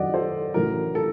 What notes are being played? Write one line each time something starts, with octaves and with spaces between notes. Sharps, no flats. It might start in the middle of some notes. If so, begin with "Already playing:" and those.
Already playing: F#2 D#3 F#3 D5 D#5 F#5
A4 C5
A1 A2 F#3 A#4
A4